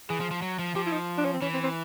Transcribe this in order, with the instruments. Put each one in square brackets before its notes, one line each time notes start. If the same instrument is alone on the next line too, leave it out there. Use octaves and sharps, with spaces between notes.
[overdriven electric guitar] E3 [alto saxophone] G#4
[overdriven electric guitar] F3
F3
F#3
F3
[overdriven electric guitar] F3 [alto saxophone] G4
[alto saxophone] E4
D#4
D4
C#4
C4
[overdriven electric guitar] E3 [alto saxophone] C#4
[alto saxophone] C4
C4